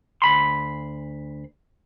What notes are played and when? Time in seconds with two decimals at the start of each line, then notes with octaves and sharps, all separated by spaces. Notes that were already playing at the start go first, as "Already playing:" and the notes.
0.22 D2 B5 C6